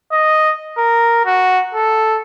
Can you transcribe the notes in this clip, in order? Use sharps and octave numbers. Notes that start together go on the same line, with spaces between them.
D#5
A#4
F#4
A4